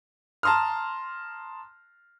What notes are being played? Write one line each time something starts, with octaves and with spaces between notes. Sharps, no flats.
A5 A#5 C6 D#6 F6